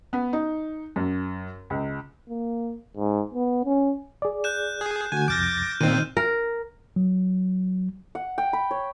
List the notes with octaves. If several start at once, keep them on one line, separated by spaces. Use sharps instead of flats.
B3
D#4
F#2
C#2
A#3
G#2
B3
C#4
G#4 D5
F#6 G6 E7
G#4
D3 A3 F#4 G#5
C2 F2 D6 F6 G6 A6 A#6
A#2 D#3 C4 D#4 D#7
A#4
F#3
F#5
G5
B5
C#5